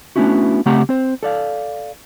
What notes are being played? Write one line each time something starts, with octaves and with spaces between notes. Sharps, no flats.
A3 B3 C#4 D4 E4 F#4
C#3 A3 C4 G4 F#5 A#5
C4 C5
A4 D5 F5